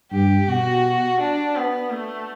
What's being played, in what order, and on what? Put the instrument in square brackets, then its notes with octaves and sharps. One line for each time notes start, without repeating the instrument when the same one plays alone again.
[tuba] G2 [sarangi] G4
[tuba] B2 [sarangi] F#4
[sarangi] D4
B3
A3